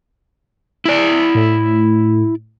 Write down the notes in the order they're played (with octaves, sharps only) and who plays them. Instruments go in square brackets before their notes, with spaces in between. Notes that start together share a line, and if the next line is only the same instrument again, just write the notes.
[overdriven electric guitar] E4 D5
[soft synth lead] A2